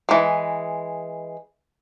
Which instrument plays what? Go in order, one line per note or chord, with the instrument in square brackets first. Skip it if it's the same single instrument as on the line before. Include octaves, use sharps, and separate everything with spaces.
[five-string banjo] E3 G#3